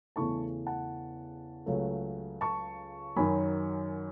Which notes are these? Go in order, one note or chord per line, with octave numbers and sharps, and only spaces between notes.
E2 C#3 E3 A3 A5 C#6
F#5 A5
C#2 C#3 F#3 A3
A5 C#6
F#2 D#3 F#3 G#5 B5